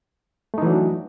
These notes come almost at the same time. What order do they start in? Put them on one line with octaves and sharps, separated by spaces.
A3 D#4 E3 F#3 D4